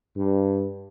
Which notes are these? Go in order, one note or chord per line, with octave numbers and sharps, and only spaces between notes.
G2